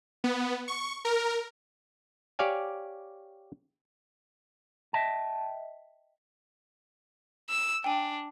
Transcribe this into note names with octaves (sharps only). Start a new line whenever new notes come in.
B3
C#6
A#4
G4 C#5 D5 F5 G#5
D#5 E5 G5 A5
E6
D4 G5 G#5